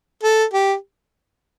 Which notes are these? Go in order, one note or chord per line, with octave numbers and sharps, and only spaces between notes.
A4
G4